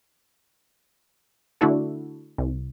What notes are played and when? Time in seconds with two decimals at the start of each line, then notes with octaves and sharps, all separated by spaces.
1.61 D3 A3 D4 E4 F#4 A4
2.38 C2